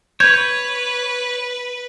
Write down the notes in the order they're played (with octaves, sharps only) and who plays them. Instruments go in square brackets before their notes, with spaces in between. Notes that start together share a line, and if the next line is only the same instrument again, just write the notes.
[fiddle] B4 [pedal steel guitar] C#5 [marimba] G6 G#6